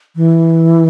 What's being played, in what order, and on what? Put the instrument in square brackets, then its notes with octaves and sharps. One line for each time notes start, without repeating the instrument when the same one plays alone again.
[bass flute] E3